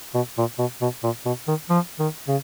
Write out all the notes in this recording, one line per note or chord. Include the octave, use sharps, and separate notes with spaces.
B2
A#2
B2
B2
A#2
B2
D#3
F3
D#3
C#3